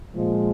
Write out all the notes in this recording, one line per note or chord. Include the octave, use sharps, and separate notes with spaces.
A#2 F3 G#3